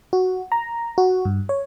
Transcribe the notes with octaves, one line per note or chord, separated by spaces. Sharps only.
F#4
A#5
F#4
G2
C#5